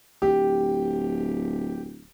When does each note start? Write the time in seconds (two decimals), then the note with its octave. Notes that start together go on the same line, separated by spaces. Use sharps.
0.22 D1 G4